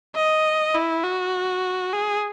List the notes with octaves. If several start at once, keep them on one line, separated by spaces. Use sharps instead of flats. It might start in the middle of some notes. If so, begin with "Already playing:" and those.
D#5
E4
F#4
G#4